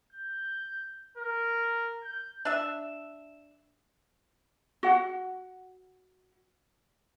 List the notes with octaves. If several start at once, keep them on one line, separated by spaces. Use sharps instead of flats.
G6
A#4
G6
D4 E5
F#4 F#5